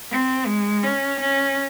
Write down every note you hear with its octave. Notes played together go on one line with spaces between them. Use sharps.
C4
G#3
C#4
C#4